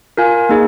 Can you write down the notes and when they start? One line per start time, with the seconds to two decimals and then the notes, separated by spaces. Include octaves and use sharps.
0.17 F4 A#4 F5 G#5
0.49 A#3 D#4 G#4